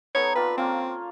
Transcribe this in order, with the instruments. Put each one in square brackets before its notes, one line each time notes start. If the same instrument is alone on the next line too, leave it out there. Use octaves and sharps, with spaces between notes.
[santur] B3 D#4 A4 [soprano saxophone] C#5
[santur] C4 F4 D5 [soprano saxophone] B4
[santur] A#3 C#4 F4 [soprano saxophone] C4